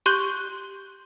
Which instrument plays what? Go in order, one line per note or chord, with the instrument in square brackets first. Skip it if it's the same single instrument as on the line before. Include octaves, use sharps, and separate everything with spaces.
[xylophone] G4 C6 C#6 F#6 G6 G7